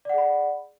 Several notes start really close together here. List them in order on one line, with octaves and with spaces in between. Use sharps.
D5 F#5 G#4 B5